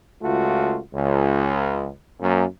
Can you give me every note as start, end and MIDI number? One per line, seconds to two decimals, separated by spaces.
0.22 0.78 37
0.22 0.78 57
0.22 0.78 65
0.22 0.78 66
0.94 1.89 37
2.20 2.44 42
2.20 2.44 58